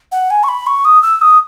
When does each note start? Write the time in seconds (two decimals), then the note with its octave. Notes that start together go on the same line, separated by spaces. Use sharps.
0.12 F#5
0.30 G#5
0.44 C#6
0.49 B5
0.67 C#6
0.85 D#6
1.03 E6
1.22 D#6